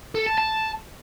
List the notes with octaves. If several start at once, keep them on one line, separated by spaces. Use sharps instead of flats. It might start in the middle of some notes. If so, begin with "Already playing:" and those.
A4
A5
A5